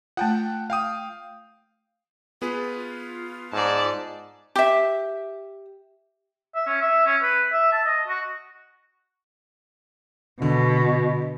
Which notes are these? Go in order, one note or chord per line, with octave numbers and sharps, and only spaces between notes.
A3 F4 F#5 G5 A5
F5 G5 D#6
B3 F4 G#4 B4
G#2 D5 A5
G4 E5
E5
C#4
E5
C#4
B4
E5
A5
D#5
F#4
B2 D3